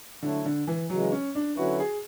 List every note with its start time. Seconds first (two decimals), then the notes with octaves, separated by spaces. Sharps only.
0.23 D3 F#3 A3 E4 A4 C#5
0.46 D3
0.67 E3
0.90 C#3 E3 F#3 G#3
1.12 C#4
1.35 D4
1.57 D3 F#3 C#4 E4 F#4 B4
1.80 G#4